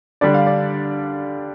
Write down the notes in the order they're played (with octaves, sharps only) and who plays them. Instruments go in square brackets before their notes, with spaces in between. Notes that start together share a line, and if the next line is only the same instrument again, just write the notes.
[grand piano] D3 G3 D4 D5
F5
D5